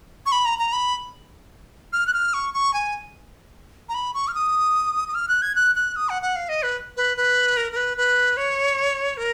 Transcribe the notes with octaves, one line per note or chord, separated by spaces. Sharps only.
C#6
B5
A#5
A#5
B5
F6
F#6
F6
C#6
C#6
G#5
A#5
B5
C#6
F6
D#6
D#6
F6
F#6
G#6
F#6
F#6
D#6
F#5
F#5
F5
D#5
B4
B4
B4
A#4
A#4
B4
B4
C#5
A#4